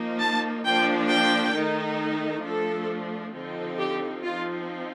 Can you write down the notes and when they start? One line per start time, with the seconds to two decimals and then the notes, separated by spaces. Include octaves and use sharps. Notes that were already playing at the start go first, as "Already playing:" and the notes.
Already playing: F3 A#3 D#4
0.20 A5
0.64 F3 A#3 D4 G5
1.10 G5
1.54 D#3 A3 D#4
2.44 F3 A3 D4 A4
3.33 D3 F3 C4 D#4
3.78 G4
4.23 F3 C4 D#4 F4